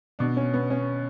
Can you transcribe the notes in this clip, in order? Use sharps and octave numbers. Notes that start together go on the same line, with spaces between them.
B2 D4
C#4
B3
C#4